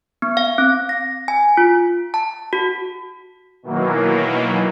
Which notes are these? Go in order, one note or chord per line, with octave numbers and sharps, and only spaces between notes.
B3
F5
C4
A#6
G#5
F4
A5
F#4
B2 D#3 E3 F#3 A#3